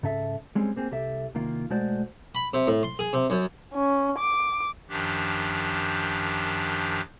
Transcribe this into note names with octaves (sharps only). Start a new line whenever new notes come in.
G#2 C#3 A4 E5
G3 G#3 C4 C#4 G#4
A#3 C4 G#4
C2 G4 A4 E5
C2 D#3 A#3 F4
B1 G#3 A3 F#4 C5 D5
B5
C3
A2
C6
G#4
C3
F#2
C#4
D6
F#2 D#3 F3 D4 G4